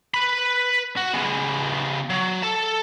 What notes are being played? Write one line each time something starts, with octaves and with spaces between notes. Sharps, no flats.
B4 B5
F#4
C#3 B3
F#3
A4 A5